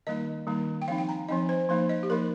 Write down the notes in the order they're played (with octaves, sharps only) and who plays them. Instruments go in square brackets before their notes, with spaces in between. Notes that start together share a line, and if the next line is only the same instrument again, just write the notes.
[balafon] D#3 G3 A#3 D#4 D#5
D#3 G3 A#3 D#4
G5
F3 C4 D#4 F5
G5
A#5
F3 C4 D#4 D#5
C5
F3 A#3 D#4 C5
D#5
G4
F3 A#3 D#4 A#4